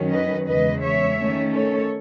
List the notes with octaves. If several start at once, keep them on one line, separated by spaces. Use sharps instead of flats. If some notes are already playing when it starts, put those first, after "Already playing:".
Already playing: F#2 D#3 F#3 C#4
B4 D#5
E2 C#3 G#3 B4 D#5
C#5 E5
D#3 A3 C#4
A4 C#5